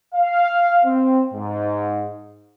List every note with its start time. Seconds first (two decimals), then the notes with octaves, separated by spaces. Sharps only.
0.15 F5
0.85 C4
1.33 G#2